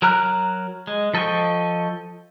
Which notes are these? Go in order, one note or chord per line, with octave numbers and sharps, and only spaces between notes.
F#3 A#4 A#5 F6 F#6
G#3
F3 A4 D#5 G5 C#6